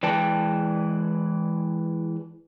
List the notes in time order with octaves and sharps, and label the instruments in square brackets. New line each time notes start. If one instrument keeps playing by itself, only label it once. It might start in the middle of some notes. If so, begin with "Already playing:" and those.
[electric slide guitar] E3 G#3 B4 D5 G5 A5